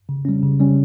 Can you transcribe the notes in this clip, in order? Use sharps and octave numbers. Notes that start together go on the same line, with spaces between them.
C#3
G3 C#4
C#3
G3 C#4